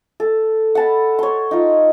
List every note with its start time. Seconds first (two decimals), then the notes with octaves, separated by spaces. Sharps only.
0.20 A4
0.75 F#5 A5 B5
1.19 C#5 C6
1.51 D#4 F4